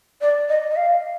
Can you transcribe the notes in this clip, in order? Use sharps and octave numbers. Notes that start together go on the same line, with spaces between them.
D5
D#5
D#5
F5